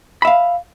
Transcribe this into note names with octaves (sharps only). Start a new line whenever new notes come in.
E5 F5 B5